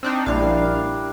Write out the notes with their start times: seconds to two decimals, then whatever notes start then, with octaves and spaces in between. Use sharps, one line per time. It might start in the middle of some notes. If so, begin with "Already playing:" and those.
0.03 C4 D4 D#4
0.26 A#1 G3 D4 E4 F5
0.42 A#4